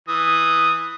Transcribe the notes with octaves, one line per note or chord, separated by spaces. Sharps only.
E3 D#6